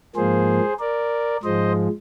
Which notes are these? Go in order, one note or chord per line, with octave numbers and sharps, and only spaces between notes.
G#2 F3 A#3 G#4 C5
A#4 D5
G#2 F3 G#3 C5 D#5